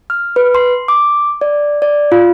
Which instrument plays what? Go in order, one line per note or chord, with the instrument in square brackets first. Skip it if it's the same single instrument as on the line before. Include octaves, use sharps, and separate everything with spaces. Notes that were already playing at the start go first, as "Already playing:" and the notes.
[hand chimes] F6
B4
C6
D6
D5
D5
F4